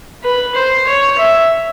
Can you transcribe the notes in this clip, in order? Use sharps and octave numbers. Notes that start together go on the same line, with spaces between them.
B4
C5
C#5
E5